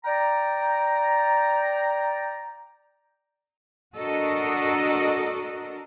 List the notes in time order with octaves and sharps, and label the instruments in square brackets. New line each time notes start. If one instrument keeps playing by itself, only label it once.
[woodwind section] D5 G5 A#5
[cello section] D4 F#4 A4 A#4 D#5